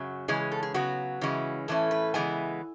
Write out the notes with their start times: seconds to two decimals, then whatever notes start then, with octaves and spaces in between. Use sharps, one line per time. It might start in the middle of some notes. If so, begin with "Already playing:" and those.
Already playing: F#2 C#3 F#3
0.28 C#3 E3 G#3 C#4 G#4
0.52 A4
0.63 G#4
0.74 C#3 F#3 B3 F#4
1.21 C#3 E3 G#3 C#4
1.68 A2 E3 A3 C#4 A4
1.91 B4
2.14 C#3 E3 G#3 B3 G#5